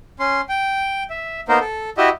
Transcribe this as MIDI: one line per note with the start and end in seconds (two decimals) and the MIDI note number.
0.19 0.41 61
0.19 0.41 84
0.49 1.04 79
1.10 1.41 76
1.48 1.59 58
1.48 1.59 59
1.48 1.59 63
1.48 1.59 70
1.48 1.59 72
1.60 1.90 69
1.97 2.10 64
1.97 2.10 66
1.97 2.10 67
1.97 2.10 75
1.97 2.10 76